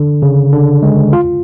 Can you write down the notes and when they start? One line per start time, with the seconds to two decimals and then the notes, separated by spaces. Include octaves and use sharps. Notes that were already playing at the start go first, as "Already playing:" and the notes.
Already playing: D3
0.22 C#3
0.52 D3
0.83 G#3
1.13 F4